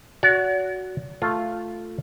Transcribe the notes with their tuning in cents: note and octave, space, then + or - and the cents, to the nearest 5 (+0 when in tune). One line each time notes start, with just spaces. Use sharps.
F#4 +0 D5 -45
A3 +0 F4 +0